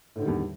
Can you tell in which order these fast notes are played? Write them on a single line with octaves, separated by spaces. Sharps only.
A2 D3 D#3 G3 E2